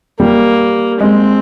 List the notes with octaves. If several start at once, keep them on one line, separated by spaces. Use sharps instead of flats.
G3 A#3
G#3 C4